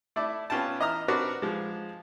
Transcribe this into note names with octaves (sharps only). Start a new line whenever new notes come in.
A3 E4 D5
B3 C#4 F4 G5 A5
E3 D#5 E5 A#5 D#6 F6
C4 D4 F#4 A#4 B4 D5
F3 G#3